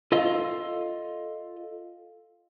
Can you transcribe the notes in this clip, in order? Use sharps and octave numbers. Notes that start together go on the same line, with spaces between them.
F4 A4 D#5 F5 C6